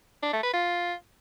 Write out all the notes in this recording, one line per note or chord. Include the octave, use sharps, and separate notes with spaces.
D4
A3
B4
F4